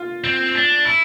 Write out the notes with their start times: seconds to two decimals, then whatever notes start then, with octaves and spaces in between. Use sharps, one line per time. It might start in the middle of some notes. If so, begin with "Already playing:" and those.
Already playing: F4
0.24 C4
0.55 D4
0.85 E4